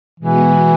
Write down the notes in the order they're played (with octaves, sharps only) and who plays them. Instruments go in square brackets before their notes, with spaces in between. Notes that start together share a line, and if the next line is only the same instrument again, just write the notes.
[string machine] B2 G#3 B3 F#4 [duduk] E3